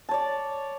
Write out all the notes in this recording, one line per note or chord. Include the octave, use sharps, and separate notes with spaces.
C#5 D5 A5